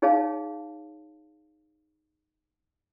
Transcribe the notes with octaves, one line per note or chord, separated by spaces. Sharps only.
D#4 G#4 C#5 F5 A5